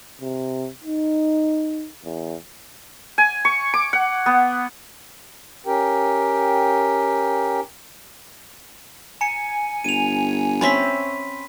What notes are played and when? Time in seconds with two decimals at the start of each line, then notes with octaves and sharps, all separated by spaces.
0.21 C3
0.84 D#4
2.04 E2
3.18 G#5
3.45 C#6
3.74 D6
3.93 F#5
4.26 B3
5.66 C#4 G4 A#4 G5
9.21 G#5 A#5 C#7
9.84 G1 D#7 F7
10.61 C4 C#4 E5 B5 C6 B6